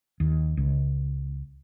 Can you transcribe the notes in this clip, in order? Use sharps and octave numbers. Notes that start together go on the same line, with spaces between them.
D#2
C#2